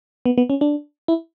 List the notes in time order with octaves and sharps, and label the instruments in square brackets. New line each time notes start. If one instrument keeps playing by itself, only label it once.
[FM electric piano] B3
B3
C#4
D4
E4